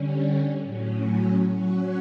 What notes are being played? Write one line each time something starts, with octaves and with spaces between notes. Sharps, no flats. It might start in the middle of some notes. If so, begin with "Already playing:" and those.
Already playing: D3 G3 C#4
A2 F#3 C#4
F#3 C#4 F#4